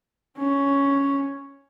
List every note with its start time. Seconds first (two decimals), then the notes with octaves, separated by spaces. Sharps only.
0.39 C#4